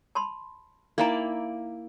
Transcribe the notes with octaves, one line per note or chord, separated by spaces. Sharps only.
A5 B5 C6
A#3 D#4 E4 D5 G5 A#5